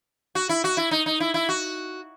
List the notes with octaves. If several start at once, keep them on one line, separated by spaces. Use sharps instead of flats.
F#4
E4
F#4
E4
D#4
D#4
E4
E4
F#4